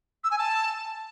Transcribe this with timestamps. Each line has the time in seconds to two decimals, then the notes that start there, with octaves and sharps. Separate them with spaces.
0.24 E6
0.31 G#5
0.38 A5